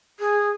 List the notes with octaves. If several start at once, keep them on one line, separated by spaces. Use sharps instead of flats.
G#4